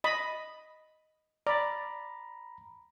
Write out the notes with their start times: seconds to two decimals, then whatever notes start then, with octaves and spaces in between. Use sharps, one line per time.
0.04 D#5 B5
1.47 D5 A#5 B5